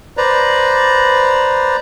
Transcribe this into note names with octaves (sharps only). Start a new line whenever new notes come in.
B4 C5 D5 A#5